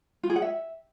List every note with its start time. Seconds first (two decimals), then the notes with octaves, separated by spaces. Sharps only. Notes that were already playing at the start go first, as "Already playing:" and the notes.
0.23 F4
0.30 G#4
0.36 F#5
0.42 E5